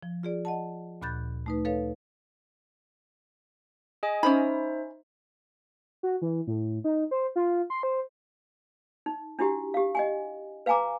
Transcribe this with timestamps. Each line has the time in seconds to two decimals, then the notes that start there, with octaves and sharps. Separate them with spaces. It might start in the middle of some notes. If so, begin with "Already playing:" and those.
0.03 F3
0.23 F4 G#4 D5
0.45 D#5 F#5 A5
1.02 D2 A#2 B5 F#6 G6 A6
1.46 A3 D#4 B4
1.65 A4 B4 C#5 F5
4.03 G#4 D#5 G#5
4.23 C#4 D#4 C5 E5 B5
6.03 F#4
6.22 E3
6.47 A2
6.84 D#4
7.11 C5
7.36 F4
7.70 C6
7.83 C5
9.06 D#4
9.39 D4 E4 F#4 G4 G5
9.74 G4 F5
9.95 D#5 G5 G#5
10.66 B4 F5 G5 G#5 A#5 D6